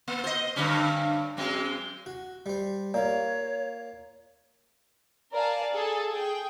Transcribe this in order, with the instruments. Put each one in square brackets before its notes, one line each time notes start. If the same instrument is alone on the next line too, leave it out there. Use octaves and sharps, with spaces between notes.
[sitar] A#3
C5 D#5
G2 D3 C#4
F#2 G#3 C4
[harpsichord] F#4
G3 C5
[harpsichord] A#3 F4 [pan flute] C#5 [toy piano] D5
[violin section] A#4 D5 F5 G#5 A5
G#4 A4
G#4 G5